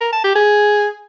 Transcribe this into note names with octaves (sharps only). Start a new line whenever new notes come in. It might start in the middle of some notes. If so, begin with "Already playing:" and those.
A#4
A5
G4
G#4